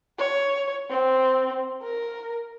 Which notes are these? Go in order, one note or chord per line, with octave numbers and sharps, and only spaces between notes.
C#5
C4
A#4